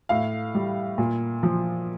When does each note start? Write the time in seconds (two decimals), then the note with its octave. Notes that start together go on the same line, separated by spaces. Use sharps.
0.09 A2 F5
0.55 G3
0.98 A#2
1.43 F3